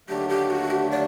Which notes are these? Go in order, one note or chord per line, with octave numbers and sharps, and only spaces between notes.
D#2 D3 F#3 A3 D4 G4
G4
F#4
G4
D5